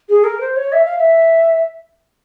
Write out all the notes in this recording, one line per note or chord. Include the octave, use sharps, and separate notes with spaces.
G#4
A#4
C5
C#5
E5
F5
E5